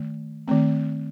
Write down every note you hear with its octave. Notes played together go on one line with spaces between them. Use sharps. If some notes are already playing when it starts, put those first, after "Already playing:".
Already playing: D#3 A3
D#3 A3 C4